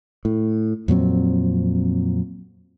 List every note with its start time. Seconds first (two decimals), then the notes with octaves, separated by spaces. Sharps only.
0.25 A2
0.88 F2 A#2 F#3 C4